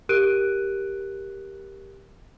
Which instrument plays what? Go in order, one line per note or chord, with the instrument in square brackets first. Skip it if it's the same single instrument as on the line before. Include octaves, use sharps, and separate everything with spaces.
[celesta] G4 A#4 F#6 D7 D#7